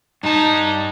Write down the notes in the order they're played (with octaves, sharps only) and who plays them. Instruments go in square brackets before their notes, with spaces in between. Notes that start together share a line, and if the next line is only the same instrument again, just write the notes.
[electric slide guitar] G2 A5 [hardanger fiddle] D#4